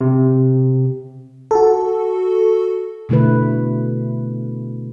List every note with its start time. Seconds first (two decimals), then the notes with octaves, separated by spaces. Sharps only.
0.01 C3
1.51 F#4 A4
3.09 B2 D3 A3 E4 B4